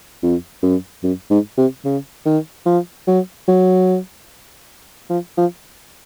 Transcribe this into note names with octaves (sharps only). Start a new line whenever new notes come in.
F2
F#2
F#2
G#2
C3
C#3
D#3
F3
F#3
F#3
F3
F3